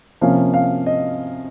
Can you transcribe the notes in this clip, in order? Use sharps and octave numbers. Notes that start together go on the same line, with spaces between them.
C3 F3 A#3 C#4 F5
F5
D#5